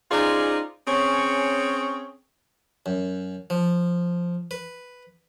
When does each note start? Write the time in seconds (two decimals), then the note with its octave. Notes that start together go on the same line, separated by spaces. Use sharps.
0.11 C#4 D#4 F4 G#4 C5 D5
0.88 C4 C#4 G#4 C#5
2.86 F#2
3.50 F3
4.51 B4